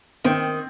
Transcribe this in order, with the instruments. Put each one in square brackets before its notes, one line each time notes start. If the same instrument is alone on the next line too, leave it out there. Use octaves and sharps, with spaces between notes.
[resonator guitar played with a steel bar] D#3 [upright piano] C4